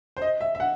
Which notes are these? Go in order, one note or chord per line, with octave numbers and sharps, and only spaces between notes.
C5
D#5
E5
E5
F#5